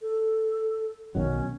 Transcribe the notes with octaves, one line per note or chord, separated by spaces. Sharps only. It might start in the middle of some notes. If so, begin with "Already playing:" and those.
A4
B1 D#3 F#3 C#4